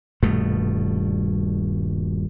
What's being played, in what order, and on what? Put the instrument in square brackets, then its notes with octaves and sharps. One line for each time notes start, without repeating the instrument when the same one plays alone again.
[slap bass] D#1 G2 B2 A3